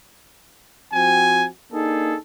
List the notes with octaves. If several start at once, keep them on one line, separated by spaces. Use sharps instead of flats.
F3 C4 F#4 G5 G#5
A#3 D4 D#4 G#4 A4